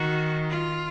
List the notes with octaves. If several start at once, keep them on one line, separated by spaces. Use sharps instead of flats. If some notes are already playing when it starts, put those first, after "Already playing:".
Already playing: D#3 F#4
F4